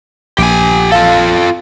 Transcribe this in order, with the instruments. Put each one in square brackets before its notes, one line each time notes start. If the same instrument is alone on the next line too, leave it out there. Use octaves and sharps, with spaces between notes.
[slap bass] A#1 [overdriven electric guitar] G4 G#5
[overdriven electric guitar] F4 A4 [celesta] F5